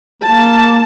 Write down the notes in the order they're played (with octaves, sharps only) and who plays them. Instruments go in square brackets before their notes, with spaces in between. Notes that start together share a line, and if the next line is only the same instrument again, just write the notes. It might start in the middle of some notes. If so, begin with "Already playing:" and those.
[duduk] A#3 [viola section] A5